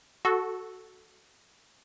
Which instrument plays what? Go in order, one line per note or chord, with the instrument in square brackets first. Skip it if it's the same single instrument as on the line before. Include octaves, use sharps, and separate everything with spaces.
[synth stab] F#4 A4